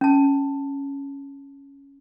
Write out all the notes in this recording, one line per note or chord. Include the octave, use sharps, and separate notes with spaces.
C#4 A5